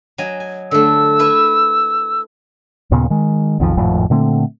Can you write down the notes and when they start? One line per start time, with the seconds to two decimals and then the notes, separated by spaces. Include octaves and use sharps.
0.18 F#3 D#5 G#5
0.40 G#5
0.71 D3 A3 E6
1.19 E4 B4 E5
2.91 D#2 A#2 C#3 B3
3.10 D#3 G#3
3.60 B1 F2 D#3 F3
3.77 G#1 F2 A2 F3
4.10 A#2 D3 A3 C4